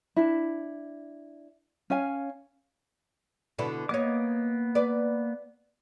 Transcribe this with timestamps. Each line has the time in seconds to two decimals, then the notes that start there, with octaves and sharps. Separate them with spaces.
0.16 D4 E4
1.90 C#4 F5 G#5
3.59 B2 D3 E4
3.89 A#3 B3 C#5 D#5 D6
4.75 B4 D5